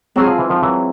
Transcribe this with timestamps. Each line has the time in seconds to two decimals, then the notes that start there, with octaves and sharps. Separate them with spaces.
0.16 F#3 G#3 C4 F4 G#4
0.27 F3
0.38 E3
0.49 D#3 F3
0.62 E3 F#3